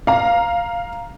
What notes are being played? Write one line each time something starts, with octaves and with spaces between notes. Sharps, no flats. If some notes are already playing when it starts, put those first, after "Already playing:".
F5 A#5